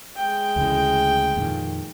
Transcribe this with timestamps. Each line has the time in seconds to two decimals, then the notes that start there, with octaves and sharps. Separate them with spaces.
0.16 G#3 G5
0.56 D2 C#3 E3
1.36 F2 A#2 D#3